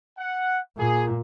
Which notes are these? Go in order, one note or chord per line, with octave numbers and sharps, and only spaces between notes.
F#5
A#2 G#4